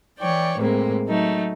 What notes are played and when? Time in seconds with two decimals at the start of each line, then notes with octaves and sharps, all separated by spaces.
0.18 E3 C#5 D5 G5
0.60 A2 C3 G#3 A#3
1.07 F#3 A3 D#4